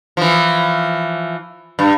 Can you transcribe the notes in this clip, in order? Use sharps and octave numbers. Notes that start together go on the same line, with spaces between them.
E3 F3
G2